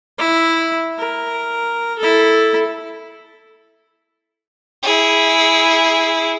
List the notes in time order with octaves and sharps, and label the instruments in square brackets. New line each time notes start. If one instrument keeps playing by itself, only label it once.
[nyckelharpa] E4
A#4
E4 A4
[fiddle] E4 G#4